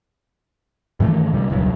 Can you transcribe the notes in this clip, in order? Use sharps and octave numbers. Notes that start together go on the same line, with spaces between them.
G2 D#3 E3 A3
C2 D3 G3
E1 C#2 G2 F#3